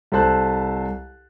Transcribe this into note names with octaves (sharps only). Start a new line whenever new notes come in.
C2 A4 C5 A5 F#6